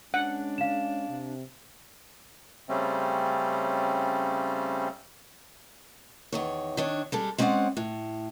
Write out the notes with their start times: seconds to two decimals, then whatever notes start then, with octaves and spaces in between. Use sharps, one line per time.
0.14 G#3 C#4 D4 F#5
0.58 F5 E7
1.09 C3
2.69 C#3 G3 A3 C4 C#4
6.32 E2 D#3 C#5
6.77 D#3 D4 C#5
7.12 G3 G#3 A4
7.38 G#3 C4 C#4 C#5 D5 F#5
7.77 A2